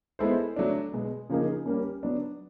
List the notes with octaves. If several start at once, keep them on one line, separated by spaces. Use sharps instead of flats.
G#3 B3 E4 A4 C5
F#3 A3 D4
B2 G#3 B3
C#3 F3 A#3 D#4 G#4
G3 A#3 C#4
F#3 B3 D4